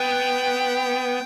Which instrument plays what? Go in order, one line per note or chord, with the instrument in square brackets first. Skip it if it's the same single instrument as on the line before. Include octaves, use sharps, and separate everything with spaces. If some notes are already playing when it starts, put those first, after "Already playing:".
Already playing: [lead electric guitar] B3 [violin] G5